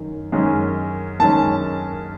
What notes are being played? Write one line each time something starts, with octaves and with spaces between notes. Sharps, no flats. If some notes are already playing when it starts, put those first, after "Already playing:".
Already playing: F#2 D#3
F#2 D#3 G#3 C#4
F#2 D#3 G#3 C#4 A5